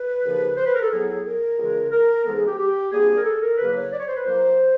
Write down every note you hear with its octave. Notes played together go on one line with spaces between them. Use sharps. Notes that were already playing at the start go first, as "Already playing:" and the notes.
Already playing: B4
D#2 C#3 F3
C5
B4
A#4
A4
A2 F#3 B3 G#4
A#4
C#2 C#3 E3 G#3
A#4
G#2 E3 G#3 B3 A4
G#4
G4
G4
F2 D3 G3 A#3 G#4
A#4
A4
A#4
E2 C#3 F#3 A#3 B4
C#5
D5
C#5
C5
B4
A#2 F#3 A#3 C5